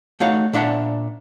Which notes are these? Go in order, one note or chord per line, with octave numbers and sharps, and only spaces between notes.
A3 D#4 F#4 C#5 F5 F#5
A#2 D4 E5 F#5 A5